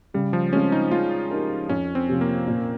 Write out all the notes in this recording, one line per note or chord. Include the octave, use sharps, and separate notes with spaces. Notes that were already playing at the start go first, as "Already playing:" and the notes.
C#3 G3
F3
G#3 C4 C#4 F4 G#4
D#4
G#3 F4
D#4 G4 A#4
F2 C#4
C4
C3 F3
A#3
A#2